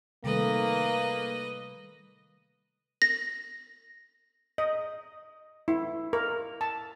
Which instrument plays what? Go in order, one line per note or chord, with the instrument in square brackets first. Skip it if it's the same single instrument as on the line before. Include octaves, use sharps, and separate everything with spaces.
[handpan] C3 D#3 A3 [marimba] G3 A4 [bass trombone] A#3 [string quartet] B4 D#5
[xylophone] A#6
[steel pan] D#5
E4
A#4
A5